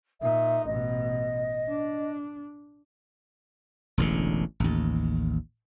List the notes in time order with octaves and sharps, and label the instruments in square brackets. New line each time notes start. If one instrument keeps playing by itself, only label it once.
[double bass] A#2 D#4 [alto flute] E5
[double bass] A1 B2 [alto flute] D#5
[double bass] D4
[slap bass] E1 A1 D3
A1 D#2